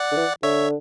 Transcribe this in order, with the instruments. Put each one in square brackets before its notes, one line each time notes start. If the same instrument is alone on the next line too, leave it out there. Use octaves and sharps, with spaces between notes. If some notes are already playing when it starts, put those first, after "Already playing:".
Already playing: [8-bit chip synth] D5 F#5
[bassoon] D3
E3
[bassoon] D3 [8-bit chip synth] C#5 E5